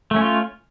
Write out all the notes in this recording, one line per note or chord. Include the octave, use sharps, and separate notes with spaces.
A3 C#4 F4